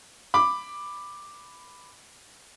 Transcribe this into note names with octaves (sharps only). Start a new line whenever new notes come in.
B5 D6